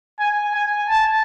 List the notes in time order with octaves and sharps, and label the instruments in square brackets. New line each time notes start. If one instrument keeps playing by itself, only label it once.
[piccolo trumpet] G#5
G#5
A5